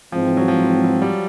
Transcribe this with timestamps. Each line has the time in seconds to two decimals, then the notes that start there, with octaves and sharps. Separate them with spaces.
0.12 G#2 E3 F3 G#3 C4
0.37 F#3
0.48 F3
0.84 F#3
1.02 G3